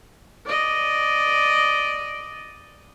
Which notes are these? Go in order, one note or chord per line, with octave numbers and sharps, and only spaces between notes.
D5 D#5